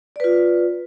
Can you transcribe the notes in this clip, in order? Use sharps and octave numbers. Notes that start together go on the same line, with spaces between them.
F4 B4 D5